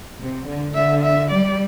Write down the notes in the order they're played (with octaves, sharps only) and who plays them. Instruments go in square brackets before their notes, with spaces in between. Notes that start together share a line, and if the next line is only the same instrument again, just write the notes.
[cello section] C3
D3
[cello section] D3 [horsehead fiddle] E5
[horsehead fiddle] E5
[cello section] G3 [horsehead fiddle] D5